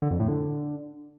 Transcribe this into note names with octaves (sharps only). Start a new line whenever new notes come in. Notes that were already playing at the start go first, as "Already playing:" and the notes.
D3
F2
A2
D3